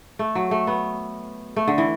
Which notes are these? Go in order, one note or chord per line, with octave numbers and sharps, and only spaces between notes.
A3
F#3
A3
B3
A3
D3
E3